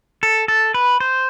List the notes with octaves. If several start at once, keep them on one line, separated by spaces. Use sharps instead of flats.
A4
A4
B4
C5